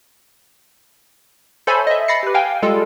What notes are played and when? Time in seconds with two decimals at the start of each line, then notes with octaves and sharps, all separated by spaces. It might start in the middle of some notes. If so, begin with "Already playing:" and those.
1.67 A4 C5 C#5 E5 G#5 B5
1.87 D#5 E5
2.08 B5 A6 A#6 C7 C#7
2.23 G4 B4
2.34 F5 G5 G#5
2.62 G3 G#3 F4 A4